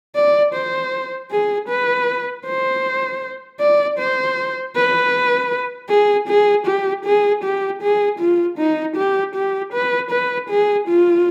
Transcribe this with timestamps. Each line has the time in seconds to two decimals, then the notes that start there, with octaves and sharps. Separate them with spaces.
0.15 D5
0.54 C5
1.31 G#4
1.68 B4
2.46 C5
3.60 D5
3.99 C5
4.76 B4
5.89 G#4
6.28 G#4
6.66 G4
7.05 G#4
7.43 G4
7.82 G#4
8.19 F4
8.58 D#4
8.96 G4
9.35 G4
9.73 B4
10.11 B4
10.49 G#4
10.88 F4